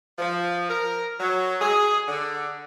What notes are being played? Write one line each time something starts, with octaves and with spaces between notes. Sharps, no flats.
F3
A#4
F#3
G#4
D3